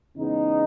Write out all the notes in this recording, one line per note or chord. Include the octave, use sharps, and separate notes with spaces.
E2 C#3 G#3 B3 D#4